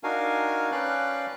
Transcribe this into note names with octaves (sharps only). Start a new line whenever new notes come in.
D4 D#4 F#4 A#4 F5 G#5
C#4 B4 D5 F5 G5 F#6